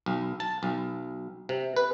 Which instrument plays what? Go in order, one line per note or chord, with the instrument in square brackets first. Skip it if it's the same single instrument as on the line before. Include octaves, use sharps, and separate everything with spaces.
[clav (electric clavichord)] B1
A5
B1
C3
B4